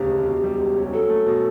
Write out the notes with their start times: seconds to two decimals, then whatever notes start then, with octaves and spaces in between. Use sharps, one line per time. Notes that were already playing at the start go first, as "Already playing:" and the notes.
Already playing: E1 D2 C#3 G4
0.10 E1
0.26 B2
0.44 G3
0.59 C#2
0.77 C#4
0.92 F#3 A4
1.09 A3
1.26 B2